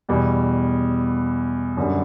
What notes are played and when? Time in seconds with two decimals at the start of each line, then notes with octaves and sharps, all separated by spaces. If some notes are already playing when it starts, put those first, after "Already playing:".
0.09 E2 B2 G3
1.77 F#2 D3 G3